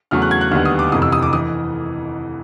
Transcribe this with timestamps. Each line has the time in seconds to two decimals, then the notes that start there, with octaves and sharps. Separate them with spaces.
0.11 E2 C#3 F#3 A3 F6
0.22 F#6
0.31 G#6
0.41 F#6
0.51 D#2 D3 G3 B3 F6
0.65 D#6
0.79 D6
0.92 F1 F2 C3 E3 D#6
1.02 E6
1.12 D#6
1.23 D6
1.33 E3 D#6